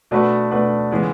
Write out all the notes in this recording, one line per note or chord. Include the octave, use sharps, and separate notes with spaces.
B2 A3 D4 F#4 B4
B2 A3 D4 F#4 B4
C#3 E3 G#3 B3